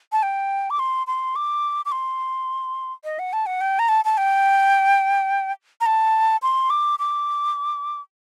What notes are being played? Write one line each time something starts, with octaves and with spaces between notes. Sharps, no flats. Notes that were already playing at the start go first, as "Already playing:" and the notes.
A5
G5
D6
C6
C6
D6
D6
C6
D#5
F#5
A5
F#5
G5
A#5
A5
A5
G5
A#5
A5
C6
D6
D6